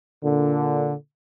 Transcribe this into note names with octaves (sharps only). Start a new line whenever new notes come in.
A#2 D3